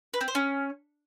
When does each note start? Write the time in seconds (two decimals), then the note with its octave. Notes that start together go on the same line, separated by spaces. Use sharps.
0.14 B4
0.21 C4
0.28 C5
0.35 C#4